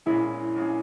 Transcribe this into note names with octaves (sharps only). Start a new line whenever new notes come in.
A#1 A#2 G#3 C#4 E4 G#4
A#1 A#2 G#3 C#4 G#4